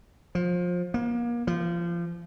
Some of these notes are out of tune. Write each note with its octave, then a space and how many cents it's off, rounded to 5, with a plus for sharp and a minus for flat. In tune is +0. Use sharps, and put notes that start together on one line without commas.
F3 +25
A#3 +30
F3 -25